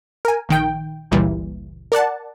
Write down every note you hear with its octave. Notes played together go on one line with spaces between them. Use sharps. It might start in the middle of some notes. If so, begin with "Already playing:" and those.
A#4 G#5
A#1 D#3 G5
G1 C#2 A#2 E3 G3
A#4 D5 F#5 A5